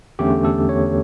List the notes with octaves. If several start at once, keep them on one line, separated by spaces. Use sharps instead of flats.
E2 D3 A3 C#4 G4
A4
C#5